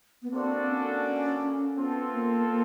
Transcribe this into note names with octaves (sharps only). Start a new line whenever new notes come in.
B3
A#3 C4 D4 F#4 A4 D5
C#4
B3 C4 F4 A4
A#3
A#3